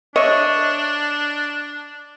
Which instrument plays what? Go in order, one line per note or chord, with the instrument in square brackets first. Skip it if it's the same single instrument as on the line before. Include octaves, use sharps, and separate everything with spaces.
[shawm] D4 [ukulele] C#5 [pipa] D#5 E5